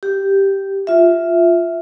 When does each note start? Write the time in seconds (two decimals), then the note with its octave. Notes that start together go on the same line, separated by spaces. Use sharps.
0.03 G4
0.87 F4 E5